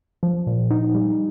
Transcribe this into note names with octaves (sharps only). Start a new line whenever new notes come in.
F3
A#2
D#4
G3